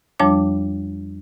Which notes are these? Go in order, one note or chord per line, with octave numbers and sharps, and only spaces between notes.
F2 F3 G3 D4 C#5 D6